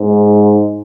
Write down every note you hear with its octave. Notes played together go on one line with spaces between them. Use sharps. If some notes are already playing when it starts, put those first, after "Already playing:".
Already playing: G#2